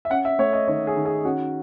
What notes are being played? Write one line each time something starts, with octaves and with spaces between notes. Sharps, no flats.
E5
C#4 F#5
E5
A3 C#5
D#5
D#3 C#5
G#4
D#3
G#4
C#4 F#4